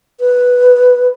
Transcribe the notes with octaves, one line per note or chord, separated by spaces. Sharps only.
B4